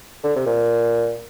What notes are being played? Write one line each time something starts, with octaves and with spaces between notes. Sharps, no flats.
D3
C3
A#2